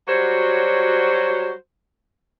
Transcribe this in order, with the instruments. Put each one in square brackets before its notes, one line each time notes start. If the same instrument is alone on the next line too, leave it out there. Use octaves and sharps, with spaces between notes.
[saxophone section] F#3 G3 F#4 C5 C#5